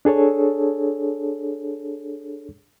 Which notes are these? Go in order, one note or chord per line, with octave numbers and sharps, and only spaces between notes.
D4 G#4 A4 C#5